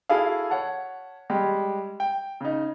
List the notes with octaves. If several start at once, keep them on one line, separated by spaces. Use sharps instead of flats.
E4 F#4 G#4 A4 F5
C#5 F#5 A5
G3 G#3 G4
G5
C#3 D#4